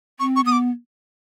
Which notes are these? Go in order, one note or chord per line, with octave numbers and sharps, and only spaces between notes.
C4 C#6
C#6
B3 D#6
D6